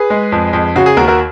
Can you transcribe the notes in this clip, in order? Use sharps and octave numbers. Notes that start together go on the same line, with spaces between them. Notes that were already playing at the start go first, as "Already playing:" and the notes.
Already playing: G#4 B4
G#3
F2
F2
C#3 F#4
G#4
D#2 F#4 A#4
F#4 A#4